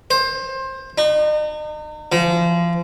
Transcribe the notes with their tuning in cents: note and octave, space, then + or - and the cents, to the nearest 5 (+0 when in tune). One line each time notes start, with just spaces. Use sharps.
C5 +20
D#4 -40
F3 -30